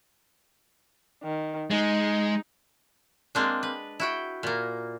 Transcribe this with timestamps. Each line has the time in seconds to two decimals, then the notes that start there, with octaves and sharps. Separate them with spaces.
1.23 D#3
1.71 G#3 D#4
3.35 G#3 A#3 C4 D4
3.63 B4
4.00 E4 F#4 G5
4.43 A#2 A#3